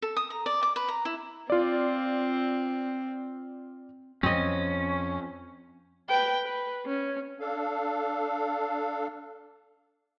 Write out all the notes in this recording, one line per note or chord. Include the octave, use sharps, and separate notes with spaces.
A4
D#6
A#5
D5
D6
B4
A#5
E4
C4 F4 D5
F2 C4 C#4 D#5
B4 G5
B4
C#4
D4 A4 F5